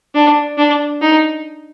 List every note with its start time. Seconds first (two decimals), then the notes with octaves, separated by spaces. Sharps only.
0.15 D4
0.58 D4
1.01 D#4